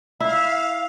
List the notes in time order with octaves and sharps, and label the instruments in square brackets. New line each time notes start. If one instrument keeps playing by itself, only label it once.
[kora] E4 [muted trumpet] E5 [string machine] F5